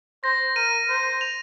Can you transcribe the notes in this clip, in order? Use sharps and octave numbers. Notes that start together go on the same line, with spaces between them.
C5 A#6
A#4 D#7
C5
F7